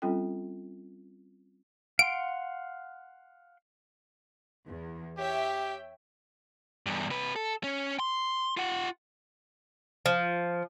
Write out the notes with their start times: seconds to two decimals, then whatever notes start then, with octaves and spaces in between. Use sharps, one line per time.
0.02 G3 C4 C#4 F4 A4 G5
1.99 F5 F#5 C6 D7
4.68 E2
5.18 G4 C#5 E5 G5
6.86 E2 G2
7.10 C3 B4
7.36 A4
7.64 C#4
8.00 C6
8.57 F4 F#5
10.06 F3